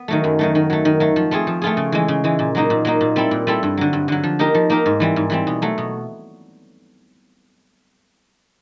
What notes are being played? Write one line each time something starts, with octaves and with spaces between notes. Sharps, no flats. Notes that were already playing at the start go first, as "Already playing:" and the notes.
Already playing: B3
D#3 F#3 A3
F#2
D#3 F#3 A3
D#3
F#3 A3
D#3
F#3 A3
F3
A3 C4 F4 G#4
F3
A3 C4 F4 G#4
C#3
E3 G#3
C#3
E3 G#3
A#2
F#3 A#3 D#4
A#2
F#3 A#3 D#4
A#2
G3 C4 E4 A4
A#2
G3 C4 E4 A4
G2
D3 F#3
G2
D3 F#3
F3
A#3 D#4 G4 A#4
F3
A#3 D#4 G4 A#4
G#2
E3 G3 C4
G#2
E3 G3 C4
B2
F#3 A3
B2